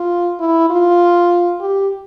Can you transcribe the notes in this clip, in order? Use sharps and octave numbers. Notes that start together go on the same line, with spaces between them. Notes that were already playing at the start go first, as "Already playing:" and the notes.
Already playing: F4
E4
F4
G4